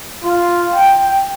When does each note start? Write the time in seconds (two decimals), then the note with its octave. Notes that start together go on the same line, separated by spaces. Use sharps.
0.23 F4
0.73 G5